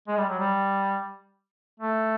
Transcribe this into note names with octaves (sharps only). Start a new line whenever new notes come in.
G#3
G3
F#3
G3
A3